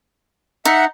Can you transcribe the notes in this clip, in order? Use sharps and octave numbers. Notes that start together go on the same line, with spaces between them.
D#4 E5 F#5